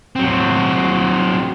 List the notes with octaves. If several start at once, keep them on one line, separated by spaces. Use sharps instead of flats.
F#3 C4